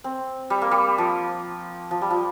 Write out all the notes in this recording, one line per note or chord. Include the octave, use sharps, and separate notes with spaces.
C4
G3
A#3
G3
F3
F3
G3
F3